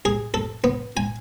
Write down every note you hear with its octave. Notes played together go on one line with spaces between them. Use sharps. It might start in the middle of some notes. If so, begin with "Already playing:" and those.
G#4
A4
B3
G#5